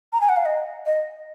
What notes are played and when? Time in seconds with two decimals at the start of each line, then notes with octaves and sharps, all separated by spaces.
0.13 A#5
0.21 G#5
0.29 F#5
0.37 F5
0.45 D#5
0.86 D#5